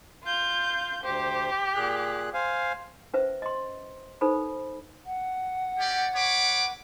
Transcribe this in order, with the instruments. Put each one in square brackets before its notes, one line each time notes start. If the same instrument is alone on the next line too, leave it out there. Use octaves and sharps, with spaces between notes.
[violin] F4 G6
[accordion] D2 C5 [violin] G4
[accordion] A#2 G#4 F#6
C5 F5 G#5
[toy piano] C#4 B4 C5 E5
D#5 C6
D#4 A4 B4 C5 B5
[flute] F#5
[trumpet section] C#4 G4 D5
B4 C#5 D6